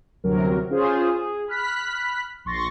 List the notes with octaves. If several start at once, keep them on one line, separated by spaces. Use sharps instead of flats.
G1 D2 C3 F#3 A#4
C#4 F4 G#4 C5
G#4
B5 F6 F#6 B6
A#1 C6 C#6 A6 A#6